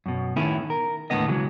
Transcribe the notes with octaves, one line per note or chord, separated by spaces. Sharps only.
F#2 B2
A2 D#3 B3 C#4 E4 G#4
A#4
D#2 A2 D3 E3 B3 D#5
C#3 E3 F#3 G#3